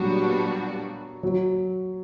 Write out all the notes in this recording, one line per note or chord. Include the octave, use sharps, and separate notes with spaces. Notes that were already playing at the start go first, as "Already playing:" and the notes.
Already playing: A#2 F#3 G3 B3 D4 F#4
F#3